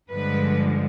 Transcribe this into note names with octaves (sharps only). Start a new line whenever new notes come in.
G2 D3 F3 G#3 B4